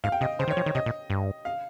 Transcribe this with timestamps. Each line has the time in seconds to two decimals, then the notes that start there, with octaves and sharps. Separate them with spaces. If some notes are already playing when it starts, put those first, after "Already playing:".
0.04 G#2 F5
0.12 G5
0.21 C3 D#5
0.39 C#3 C5
0.48 D#3
0.51 C#5
0.57 F3
0.66 D#3
0.75 C3 D#5
0.86 A#2
1.10 G2
1.45 F5